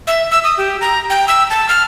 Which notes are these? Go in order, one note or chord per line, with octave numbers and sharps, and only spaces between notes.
E5
E6
D#6
G4
A#5
G5
E6
A5
F6